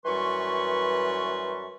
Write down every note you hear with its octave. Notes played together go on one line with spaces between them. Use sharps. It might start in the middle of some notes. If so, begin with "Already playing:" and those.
F#2 E3 G3 B4 C6 C#6